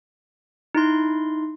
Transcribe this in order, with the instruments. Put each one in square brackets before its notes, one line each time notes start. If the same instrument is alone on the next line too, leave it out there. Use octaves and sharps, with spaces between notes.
[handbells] D#4 E4 C6